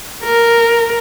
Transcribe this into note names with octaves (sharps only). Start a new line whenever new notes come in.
A#4